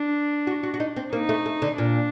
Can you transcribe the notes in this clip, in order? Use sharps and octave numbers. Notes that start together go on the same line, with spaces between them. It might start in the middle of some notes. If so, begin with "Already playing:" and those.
Already playing: D4
F#4
F#4
F#4
D#4
C4
A#3 D#4
A3
A3
D3
A#2 D4